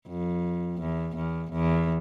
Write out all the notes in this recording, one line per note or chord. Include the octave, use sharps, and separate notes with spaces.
F2
E2
E2
E2